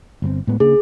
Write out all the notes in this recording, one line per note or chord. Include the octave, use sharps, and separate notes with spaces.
G1 C3 C4
A2 G#3 B3
C#3 A#3 D4 G#4